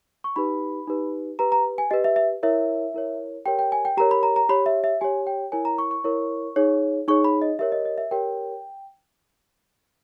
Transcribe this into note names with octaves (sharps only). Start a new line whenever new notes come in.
C#6
D#4 G4 B4 B5
D#4 G4 B4
G4 B4 A#5
A#5
G#5
G4 B4 D#5
E5
E5
E4 A#4 C#5 E5
E4 A#4 C#5
G4 A#4 C#5 G5
G5
G#5
G5
G4 A#4 C#5 A#5
B5
A#5
A#5
G4 C#5 B5
E5
E5
G4 C#5 G#5
G5
E4 A#4 C#5 G#5
A#5
C#6
C#6
E4 A#4 C#5
D#4 G#4 C#5
D#4 G#4 C#5 C#6
B5
D#5
G4 A#4 C#5 E5
D#5
D#5
E5
G4 A#4 C#5 G5